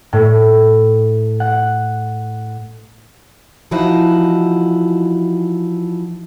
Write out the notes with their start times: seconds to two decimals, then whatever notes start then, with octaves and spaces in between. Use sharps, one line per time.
0.13 A2
1.40 F#5
3.71 E3 F3 D#4 E4 F#4